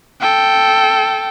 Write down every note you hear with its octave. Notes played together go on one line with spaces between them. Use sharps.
A4 G5